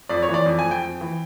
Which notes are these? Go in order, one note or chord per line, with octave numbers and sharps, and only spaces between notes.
F2 D5
C#5
E3
D5
F2
G#5
F2
G5
F2
E3